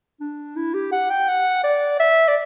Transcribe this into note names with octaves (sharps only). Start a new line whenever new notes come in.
D4
E4
G4
F#5
G5
F#5
D5
E5
D5